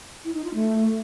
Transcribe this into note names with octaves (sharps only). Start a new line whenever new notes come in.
E4
D#4
F4
A3